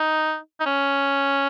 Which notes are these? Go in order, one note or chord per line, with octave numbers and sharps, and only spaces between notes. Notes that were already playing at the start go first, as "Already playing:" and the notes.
Already playing: D#4
D#4
C#4